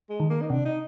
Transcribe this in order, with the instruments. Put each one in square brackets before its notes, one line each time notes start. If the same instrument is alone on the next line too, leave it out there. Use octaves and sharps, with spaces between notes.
[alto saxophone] G#3
[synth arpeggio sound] D#3
[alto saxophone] A#3
D#4
[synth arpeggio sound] C3 [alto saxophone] D4
[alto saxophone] D#4